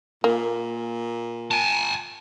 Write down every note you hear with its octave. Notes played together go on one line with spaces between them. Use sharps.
A#2 A#3
G#5 A5